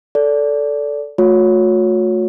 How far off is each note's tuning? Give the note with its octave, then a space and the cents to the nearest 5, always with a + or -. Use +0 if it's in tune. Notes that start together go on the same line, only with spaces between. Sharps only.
A4 +0 D5 -20
A3 +0 F#4 -40 C#5 +0